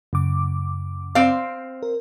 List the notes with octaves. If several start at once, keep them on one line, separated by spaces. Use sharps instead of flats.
F#2 C#3 D6
C4 F5
A#4